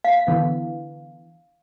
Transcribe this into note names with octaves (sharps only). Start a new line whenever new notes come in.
F5 B6
D3 E3 B3